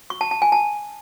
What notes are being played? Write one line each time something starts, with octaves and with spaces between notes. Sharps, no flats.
C#6
A5
A5
G#5
A5